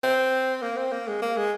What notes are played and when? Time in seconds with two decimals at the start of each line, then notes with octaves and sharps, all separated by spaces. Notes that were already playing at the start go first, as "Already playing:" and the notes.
0.03 C4
0.62 A#3
0.77 C4
0.92 A#3
1.08 G#3
1.22 A#3
1.37 G#3